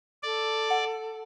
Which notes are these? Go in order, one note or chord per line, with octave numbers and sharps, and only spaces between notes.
A4 D5
F#5